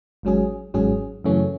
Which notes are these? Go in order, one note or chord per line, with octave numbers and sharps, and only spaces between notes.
G#1 G#2 F#3 C#4 G#4
G#1 G#2 F#3 C#4 G#4
F#2 C#3 E3 A3 C#4